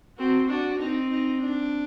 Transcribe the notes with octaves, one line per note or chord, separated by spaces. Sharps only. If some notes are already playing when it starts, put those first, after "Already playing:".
C4 F#4
D4 F#4
C4 D#4
D#4
D4